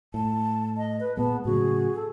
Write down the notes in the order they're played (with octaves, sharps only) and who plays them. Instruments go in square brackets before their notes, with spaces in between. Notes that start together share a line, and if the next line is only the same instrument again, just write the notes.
[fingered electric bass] A2 [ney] A5
[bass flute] D#5
B4
[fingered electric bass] A#2 G#3 [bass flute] B3 [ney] A5
[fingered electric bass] A2 C#3 F#3 [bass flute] F#4 [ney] G#4
[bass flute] A4